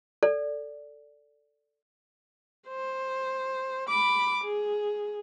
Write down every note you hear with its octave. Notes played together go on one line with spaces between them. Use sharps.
A4 D5
C5
B5 D6
G#4